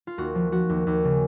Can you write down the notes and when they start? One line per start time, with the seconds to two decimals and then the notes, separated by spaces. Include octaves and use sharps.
0.07 F4
0.18 D#2 F#4
0.35 F3
0.52 F3 F#4
0.69 D#2
0.87 D#2
1.04 C#3